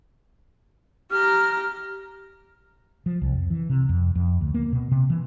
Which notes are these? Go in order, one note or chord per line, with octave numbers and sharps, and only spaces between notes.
G4 A#5 F6
F3
C2
F2
E3
C3
F2
F2
D2
A#3
B2
C3
E3